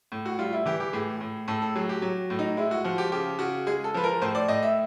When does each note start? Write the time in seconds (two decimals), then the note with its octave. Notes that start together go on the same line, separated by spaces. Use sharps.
0.12 A2
0.25 F#4
0.39 G3 F4
0.53 E4
0.66 E3 G4
0.80 G4
0.93 A2 G#4
1.21 A2
1.48 A2 A4
1.62 A4
1.75 F#3 G#4
1.89 G4
2.02 F#3
2.30 A2
2.39 D#4
2.57 G#3 E4
2.71 F#4
2.84 F3 F#4
2.98 G4
3.12 C#3 G4
3.39 C#3 F#4
3.67 G#3 G#4
3.84 A4
3.94 F3 B4
4.04 A#4
4.22 A2 C5
4.35 D5
4.48 A2 D#5
4.63 E5